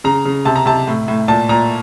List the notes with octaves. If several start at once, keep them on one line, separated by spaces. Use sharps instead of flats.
C#3 A#5
C#3
C3 A5
A#5
C3 A5
A2
A2
A#2 A5
A#2 A#5